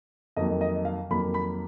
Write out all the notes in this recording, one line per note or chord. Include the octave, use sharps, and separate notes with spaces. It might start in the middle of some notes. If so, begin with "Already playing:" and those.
F2 D#3 F#3 A#3 D#5
D#5
F5
F2 D#3 F#3 A#3 B5
B5